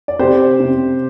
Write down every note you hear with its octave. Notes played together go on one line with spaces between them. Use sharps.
D5
C3 G4 C5
C3